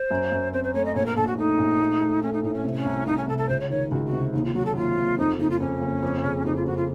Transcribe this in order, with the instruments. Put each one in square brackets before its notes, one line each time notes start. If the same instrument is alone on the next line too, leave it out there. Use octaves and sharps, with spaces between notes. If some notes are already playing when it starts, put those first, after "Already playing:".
Already playing: [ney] C5
[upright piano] F#2
F#2
[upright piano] C4 [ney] C5
[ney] C5
[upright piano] A3 [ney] C#5
[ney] D#5
[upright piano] A#1 [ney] C#5
[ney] A#4
[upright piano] A#1 [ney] A4
[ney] F#4
[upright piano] A3 [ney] D#4
[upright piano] A#1
A3
A3
[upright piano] A3 [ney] C#4
[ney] D#4
[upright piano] A2 [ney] D#4
[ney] C#4
[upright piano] C3
[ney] C#4
[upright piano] C2
[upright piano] C2 [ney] D#4
[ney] C#4
[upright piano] C3 [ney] A4
[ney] A4
[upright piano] C#2 [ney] C5
[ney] C#5
[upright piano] D#3 [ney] C#5
[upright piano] C#2 [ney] F#4
[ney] F#4
[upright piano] C3
[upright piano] D#2 [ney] D#4
[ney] F4
[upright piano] F#3 [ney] F#4
[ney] A4
[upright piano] D#2 [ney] F4
[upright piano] D#2
[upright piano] F2 [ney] D#4
[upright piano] F#1 [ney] D#4
[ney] F4
[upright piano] F2 [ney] C#4
[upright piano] F#1
F2
C#3
[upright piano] F2 [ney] D#4
[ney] F4
[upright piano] F2 [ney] F#4
[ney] F4